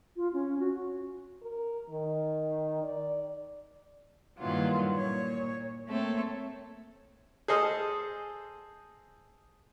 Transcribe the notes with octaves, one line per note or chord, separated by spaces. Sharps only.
F4
C#4
F#4
A#4
D#3
D5
G2 A#2 D#3 E3 F#3 F4
A#2 C#5
A3 A#3 C4 A4 C#5
G#4 A4 C5 D#5 D#6 F6